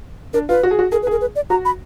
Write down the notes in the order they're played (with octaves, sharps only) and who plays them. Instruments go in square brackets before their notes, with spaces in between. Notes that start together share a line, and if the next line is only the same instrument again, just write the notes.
[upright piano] D4 [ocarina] A#4
[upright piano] F4 [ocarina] B4
[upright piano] F#4
G#4
F#4
[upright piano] G#4 [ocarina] A#4
[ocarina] B4
[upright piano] G#4 [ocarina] A#4
[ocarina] B4
D5
[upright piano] F#4 [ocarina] A#5
[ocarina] B5